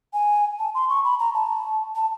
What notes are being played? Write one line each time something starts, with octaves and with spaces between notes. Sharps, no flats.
G#5
A5
C6
C#6
B5
A#5
A5
A5